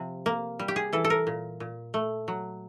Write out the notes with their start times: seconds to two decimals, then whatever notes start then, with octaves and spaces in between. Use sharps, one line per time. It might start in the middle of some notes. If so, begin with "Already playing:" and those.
Already playing: C3 F3
0.26 A#3
0.59 G3
0.68 G4
0.76 G#4
0.93 E3 A4
1.04 A4
1.10 A#4
1.27 A#2
1.60 A#2
1.94 A3
2.28 F#3